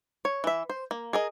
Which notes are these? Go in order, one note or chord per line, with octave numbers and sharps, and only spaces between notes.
C#5
E3 E5
C5
A#3
G#4 A#4 D#5